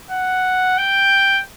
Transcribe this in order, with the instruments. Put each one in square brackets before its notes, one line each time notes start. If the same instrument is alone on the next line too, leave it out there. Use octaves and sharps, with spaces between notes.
[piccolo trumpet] F#5
G5